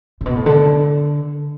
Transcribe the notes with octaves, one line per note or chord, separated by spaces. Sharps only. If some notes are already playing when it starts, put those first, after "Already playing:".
A2
B2
A2
D3